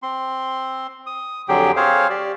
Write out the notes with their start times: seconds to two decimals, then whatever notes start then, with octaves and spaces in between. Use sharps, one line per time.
0.03 C4 C6
1.06 D#6
1.49 F2 D3 F#3 G4 G#4 G5
1.76 C4 G#4 C5 C#5 F5
2.10 G4 D5